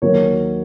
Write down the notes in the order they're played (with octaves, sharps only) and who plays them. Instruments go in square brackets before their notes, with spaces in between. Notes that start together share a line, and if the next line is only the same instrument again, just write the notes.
[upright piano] D#2 D#3 F#3 A#3 C#5